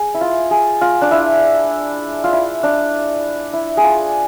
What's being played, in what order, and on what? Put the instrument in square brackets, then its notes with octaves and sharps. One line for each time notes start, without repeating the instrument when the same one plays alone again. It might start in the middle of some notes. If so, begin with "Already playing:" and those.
Already playing: [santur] G#4
E4
F4
G#4
F4
D4
E4
F4
E4
D4
E4
G#4
F4